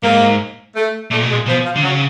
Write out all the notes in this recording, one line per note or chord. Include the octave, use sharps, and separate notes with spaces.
G#2 A#3
A3
A#2 A3
B2
G#3
A#2
B2 F3
F3
D3
C#3 F#3